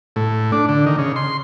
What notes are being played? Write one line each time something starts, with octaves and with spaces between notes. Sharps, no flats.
A2
D4
D3
D#3
C#3
C6